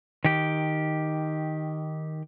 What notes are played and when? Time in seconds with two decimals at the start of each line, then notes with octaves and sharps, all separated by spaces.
0.24 D#3 G4